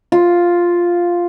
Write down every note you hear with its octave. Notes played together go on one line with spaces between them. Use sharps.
F4